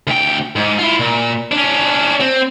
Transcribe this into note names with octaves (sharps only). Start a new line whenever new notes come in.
D2 G5
G#2
E4 F4
A#2
C#4 D4
C4